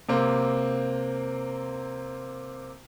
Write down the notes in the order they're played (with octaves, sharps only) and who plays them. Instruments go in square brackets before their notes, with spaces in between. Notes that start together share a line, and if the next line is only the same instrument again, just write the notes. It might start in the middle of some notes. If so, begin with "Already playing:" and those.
[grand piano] C3 A#3 C4